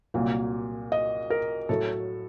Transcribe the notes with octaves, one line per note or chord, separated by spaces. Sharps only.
C2 A#2 F#3 A#3
D#5
A#4
A2 F#3 A3 A4